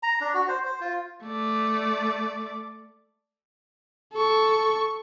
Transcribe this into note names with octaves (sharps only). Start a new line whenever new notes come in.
A#5
D4
F#4
C5
C5
F4
A3 D5
A4 C#6